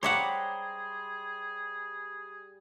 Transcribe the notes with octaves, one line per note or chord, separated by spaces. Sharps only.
G3 G#4 C5 C#5 E5 F#5 A#5 D6